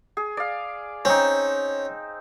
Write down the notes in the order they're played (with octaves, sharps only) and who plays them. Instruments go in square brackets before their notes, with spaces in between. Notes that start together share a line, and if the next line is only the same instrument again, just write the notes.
[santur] G#4
D5 F5
[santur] C4 D#4 [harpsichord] C#4